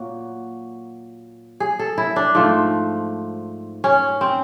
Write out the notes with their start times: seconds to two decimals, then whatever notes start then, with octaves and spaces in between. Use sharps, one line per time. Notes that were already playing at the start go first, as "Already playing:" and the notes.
Already playing: A#2 F#3 A#3 F#4
1.60 G#4
1.79 A4
1.98 E4
2.16 D4
2.35 G#2 F3 A3
3.84 C#4
4.21 C4